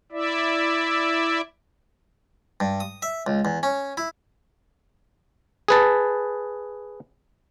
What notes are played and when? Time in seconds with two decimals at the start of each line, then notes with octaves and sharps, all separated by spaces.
0.12 E4 D5 E5
2.60 G2
2.80 D#6
3.02 E5
3.27 C#2
3.45 E2
3.63 C#4
3.97 E4
5.68 G#4 B4 A5